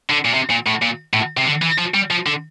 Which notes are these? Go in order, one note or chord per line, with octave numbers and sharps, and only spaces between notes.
D3
A#2
C3
A#2
A2
A#2
A2
C3
D3
E3
F3
G3
F3
D3